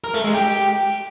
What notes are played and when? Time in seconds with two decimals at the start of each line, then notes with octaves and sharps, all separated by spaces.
0.04 A#4
0.14 A3
0.24 G#3
0.34 G4